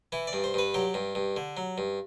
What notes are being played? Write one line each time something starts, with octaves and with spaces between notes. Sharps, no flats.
E3 E4
D5
G2
C5
G2 B4
F#3 G4
G2
G2
D3
F#3
G2